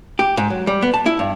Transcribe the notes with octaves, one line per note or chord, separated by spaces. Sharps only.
G4
G#2
F#3
G3
B3
A5
E4
G2